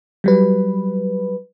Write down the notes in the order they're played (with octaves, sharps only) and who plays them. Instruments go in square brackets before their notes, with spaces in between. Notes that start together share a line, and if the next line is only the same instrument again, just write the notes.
[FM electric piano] F#3 G3 B4